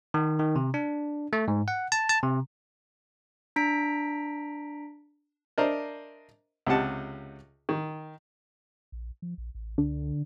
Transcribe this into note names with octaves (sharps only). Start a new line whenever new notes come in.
D#3
D#3
C3
D4
A3
G#2
F#5
A5
A5
C3
D4 A#5 B6 D7
D4 A#4 C5 D#5 E5 A#5
C#2 C3 G4 D#5 F#5 A5
D#3
A#1
F3
A#1
A1
C#2 D3